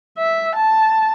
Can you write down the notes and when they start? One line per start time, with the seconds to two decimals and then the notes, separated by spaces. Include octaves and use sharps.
0.18 E5
0.56 A5